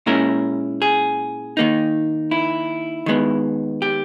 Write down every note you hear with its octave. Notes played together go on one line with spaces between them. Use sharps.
A#2 G#3 C#4 E4 A#4
G#4
D#3 A#3 D#4
E4
D#3 G#3 B3
G4